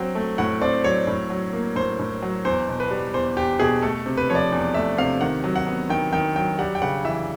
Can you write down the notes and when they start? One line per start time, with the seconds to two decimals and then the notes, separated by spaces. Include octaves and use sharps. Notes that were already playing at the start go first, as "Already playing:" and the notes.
Already playing: F#3 C4 G5
0.15 A3
0.38 A2 F#5
0.61 C4 D5
0.84 F#3 C#5
1.07 A2
1.30 F#3
1.53 A#3
1.76 A2 C5
1.99 A2
2.22 F#3
2.45 E2 C5
2.68 B2
2.80 B4
2.91 G3
3.14 E2 C5
3.37 E2 G4
3.60 B2 G#4
3.82 A3 A4
4.06 C3
4.17 B4
4.30 F3 C#5
4.35 D5
4.52 E2
4.74 A3 E5
4.98 C3 F5
5.21 D#3 F#5
5.44 F#3
5.56 F#5
5.67 B3
5.89 D#3 G5
6.13 D#3 G5
6.36 F#3 G5
6.59 G3 F#5
6.75 G5
6.82 C#3 F#5
7.05 E3 E5